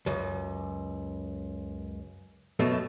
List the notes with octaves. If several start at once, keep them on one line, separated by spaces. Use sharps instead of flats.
C#2 F#2
F#2 B2 A3